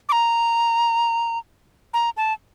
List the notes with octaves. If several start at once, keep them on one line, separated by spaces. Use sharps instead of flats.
D6
A#5
A#5
A5